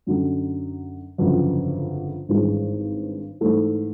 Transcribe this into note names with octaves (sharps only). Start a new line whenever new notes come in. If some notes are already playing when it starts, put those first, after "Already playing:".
F#2 D3 F#3
G1 F2 C#3 F#3
G#1 G2 E3 G#3
G#2 E3 A3